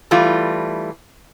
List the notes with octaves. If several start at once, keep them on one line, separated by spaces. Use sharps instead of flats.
E3 G3 A3 F4